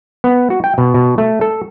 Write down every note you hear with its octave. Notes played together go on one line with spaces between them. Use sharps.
B3
F#4
G5
B2
B2
A3
A4